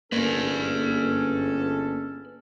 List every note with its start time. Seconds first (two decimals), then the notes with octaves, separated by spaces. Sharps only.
0.12 G1 A#3 C#4 G#4 A4 B4 D5